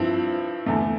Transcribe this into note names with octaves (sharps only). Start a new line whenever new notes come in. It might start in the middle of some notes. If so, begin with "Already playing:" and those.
Already playing: G2 F3 C4 E4
E2 D3 A3